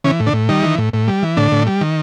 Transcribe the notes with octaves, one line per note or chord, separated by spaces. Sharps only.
C#3 E3 C#4
A2
D3 D4
A2
D#3 G3 D#4
E3
A2
A2
G3
E3
A2 D3 D4
A2
G3
D#3